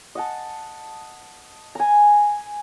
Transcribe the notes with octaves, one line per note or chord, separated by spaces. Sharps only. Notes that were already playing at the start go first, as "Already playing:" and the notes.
D#5 F#5 A5
G#5 A#5